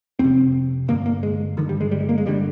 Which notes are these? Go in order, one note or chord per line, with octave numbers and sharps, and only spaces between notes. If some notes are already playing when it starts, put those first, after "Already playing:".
F2 C3 C4
G2 D3 A#3
A#3
G#3
G2 D3 D#3
G3
G#3
G3
G#3
A#3
G#3
G2 D3 G3